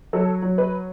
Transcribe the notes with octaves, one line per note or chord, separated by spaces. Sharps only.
F#3 A4
F#3
B4